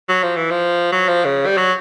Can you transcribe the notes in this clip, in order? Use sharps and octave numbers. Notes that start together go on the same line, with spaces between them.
F#3
F3
E3
F3
F#3
F3
C#3
G3
F#3